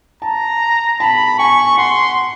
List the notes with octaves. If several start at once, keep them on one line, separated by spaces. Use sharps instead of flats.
A5 A#5
A5 B5
G#5 C#6
F#5 C6